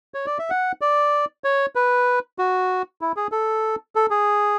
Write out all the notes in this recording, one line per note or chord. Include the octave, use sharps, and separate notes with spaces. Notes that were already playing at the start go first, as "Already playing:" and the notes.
C#5
D5
E5
F#5
D5
C#5
B4
F#4
E4
G#4
A4
A4
G#4